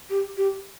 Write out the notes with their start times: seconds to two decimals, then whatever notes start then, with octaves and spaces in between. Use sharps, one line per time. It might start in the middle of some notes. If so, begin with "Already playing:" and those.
0.10 G4
0.37 G4